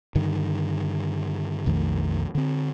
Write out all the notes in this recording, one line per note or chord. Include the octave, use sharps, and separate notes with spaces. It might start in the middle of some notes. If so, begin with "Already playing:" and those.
G2 D3 D#3
B1 F2 D#3 A3
D3 C4